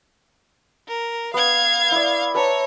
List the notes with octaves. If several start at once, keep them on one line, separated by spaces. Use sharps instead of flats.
A#4
B3 F5 G#6
E4 D5
B4 C#5 A5 A#5